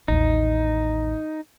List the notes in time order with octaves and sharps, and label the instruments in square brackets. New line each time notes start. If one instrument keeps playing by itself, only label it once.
[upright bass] A1 D#2 [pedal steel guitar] D#4